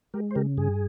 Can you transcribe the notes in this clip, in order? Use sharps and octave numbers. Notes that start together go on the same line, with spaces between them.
G#3 G4 A#4
C5
C#3 G4 A#4
G2 G#4